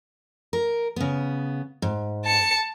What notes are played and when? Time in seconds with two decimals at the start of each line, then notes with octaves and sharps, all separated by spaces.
0.53 A#4
0.96 C#3 B3
1.82 G#2
2.26 A5 C#7